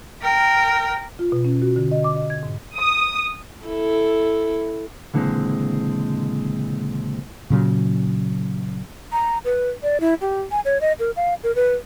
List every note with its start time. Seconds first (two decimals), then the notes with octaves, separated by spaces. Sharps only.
0.22 A#4 G5
1.19 F4
1.32 B2
1.45 C#4
1.62 F#4
1.76 D3
1.91 D#5
2.04 D6
2.16 D#5
2.30 G#6
2.43 G#2
2.78 D#6
3.64 E4 A4
5.14 C#2 A#2 D3 E3 G#3 C4
7.50 A#2 C#3 F#3
9.12 A#5
9.45 B4
9.83 D5
10.00 E4
10.21 G4
10.51 G#5
10.65 C#5
10.81 D#5
11.00 A#4
11.16 F5
11.44 A#4
11.55 B4